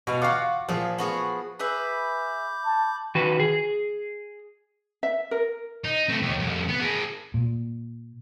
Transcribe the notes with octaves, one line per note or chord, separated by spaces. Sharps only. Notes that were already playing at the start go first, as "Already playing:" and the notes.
B2 F#4 F5
F4 F#4 F5 F#5 D6
A#2 F3 G#4
B3 F#4 G#4
G#4 B4 E5 B5 D6 G6
A5
D#3 F#4 B4
G#4
E5
A#4
D#4
A3 C4
D#2 D#3
C2 F2
B3
G#4 A#4
A#2